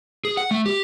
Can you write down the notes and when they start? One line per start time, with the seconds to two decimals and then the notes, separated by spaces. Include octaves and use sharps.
0.25 G#4
0.37 F#5
0.51 A3
0.66 G4